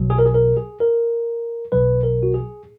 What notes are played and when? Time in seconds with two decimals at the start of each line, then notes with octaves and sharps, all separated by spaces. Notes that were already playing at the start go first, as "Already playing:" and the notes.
Already playing: B1 B2 F#3
0.10 G#4
0.18 A#4
0.26 G#4
0.34 A#4
0.57 G#4
0.80 A#4
1.72 B1 B2 F#3 B4
2.03 A#4
2.23 F#4
2.34 G#4